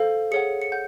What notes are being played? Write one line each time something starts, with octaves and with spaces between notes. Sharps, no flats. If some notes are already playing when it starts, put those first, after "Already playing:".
Already playing: A4 C5 F5
G#4 C#5 F#5 C#7
C#7
F#5 G6